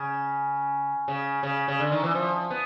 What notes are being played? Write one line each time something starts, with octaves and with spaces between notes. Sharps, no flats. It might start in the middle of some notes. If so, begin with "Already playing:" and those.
Already playing: C#3
C#3
C#3
C#3
D3
D#3
E3
F3
B3